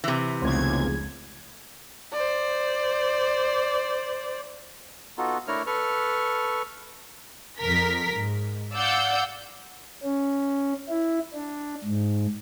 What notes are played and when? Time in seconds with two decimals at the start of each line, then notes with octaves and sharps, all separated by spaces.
0.04 C3 E3
0.42 F1 C#2 C#3 F3 B3 F4 G#6
2.13 C5 D5
5.18 B3 D#4 F4 F#4 A4
5.48 A3 D4 E4 A#4 C#5 F6
5.67 A4 B4 C#6 F6
7.60 F2 A#4 B6
8.13 G#2
8.73 D5 F5 F#5 E6 G6
10.03 C#4
10.89 E4
11.34 D4
11.85 G#2